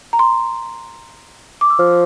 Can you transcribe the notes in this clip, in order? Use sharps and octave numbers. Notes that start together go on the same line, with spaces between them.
A#5
C6
D6
E6
F3 F6